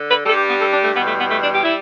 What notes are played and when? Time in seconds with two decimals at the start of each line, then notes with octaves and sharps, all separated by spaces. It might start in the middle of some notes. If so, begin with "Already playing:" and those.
Already playing: D3
0.08 B4
0.26 G2 G3 A4
0.37 G4
0.49 B3
0.61 A4
0.72 D4
0.83 A3
0.95 E2 B2 G3 B3
1.06 A3
1.18 B3
1.30 A3
1.41 D4
1.52 G4
1.63 G3 E4